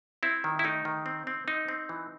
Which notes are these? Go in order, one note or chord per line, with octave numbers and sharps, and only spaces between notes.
C4 E4
D#3
E4
A3 D#4
D#3
C4
C4
C4 D#4
C4
E3